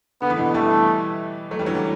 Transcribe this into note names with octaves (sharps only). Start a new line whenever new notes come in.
D3 B3
E3
B2 D3
E3 G3 A3
F#3 A3
E3 G3
D3 F#3
E3 G3